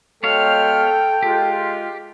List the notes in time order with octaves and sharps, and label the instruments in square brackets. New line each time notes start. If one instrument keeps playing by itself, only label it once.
[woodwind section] F#3 G#3 F6 [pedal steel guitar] B3 C#5 F5 [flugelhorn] A4 [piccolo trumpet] G5
[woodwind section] G#3 F4 [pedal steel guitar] G4